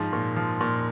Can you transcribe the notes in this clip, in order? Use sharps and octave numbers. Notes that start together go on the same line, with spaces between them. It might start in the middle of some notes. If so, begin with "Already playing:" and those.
Already playing: G#2 F3
A#2
F3
A#2